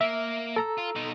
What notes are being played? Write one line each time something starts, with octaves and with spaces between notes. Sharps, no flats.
A#3 E5
A4 A#5 E6
F4
B2 D#4